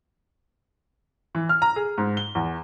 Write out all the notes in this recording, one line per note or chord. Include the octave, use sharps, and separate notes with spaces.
E3
F6
A#5
G#4
G#2
G7
E2